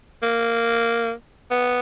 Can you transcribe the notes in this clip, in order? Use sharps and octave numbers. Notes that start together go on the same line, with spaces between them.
A#3
B3